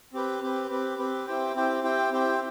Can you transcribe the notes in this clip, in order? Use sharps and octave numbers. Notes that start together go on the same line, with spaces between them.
C4 G4 B4
C4 G4 B4
C4 G4 B4
C4 G4 B4
C4 E4 G4 C5 G5
C4 E4 G4 C5 G5
C4 E4 G4 C5 G5
C4 E4 G4 C5 G5